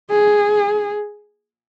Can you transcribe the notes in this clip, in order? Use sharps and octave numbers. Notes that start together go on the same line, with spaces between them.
G#4